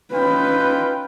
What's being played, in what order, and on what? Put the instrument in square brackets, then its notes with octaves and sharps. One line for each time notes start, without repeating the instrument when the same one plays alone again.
[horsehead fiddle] C#4 B4 [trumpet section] D#4 F4 G5